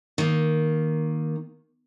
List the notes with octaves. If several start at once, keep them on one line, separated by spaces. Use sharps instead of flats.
D#3 A#3